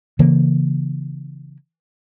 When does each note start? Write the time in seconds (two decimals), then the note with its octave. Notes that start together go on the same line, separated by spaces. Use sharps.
0.19 C#3 E3 A#3